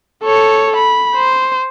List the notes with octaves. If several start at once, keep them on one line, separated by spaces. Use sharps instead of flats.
A4 C#5
B5
C5